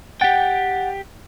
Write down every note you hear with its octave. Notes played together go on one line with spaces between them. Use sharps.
G4 F#5 G5 A6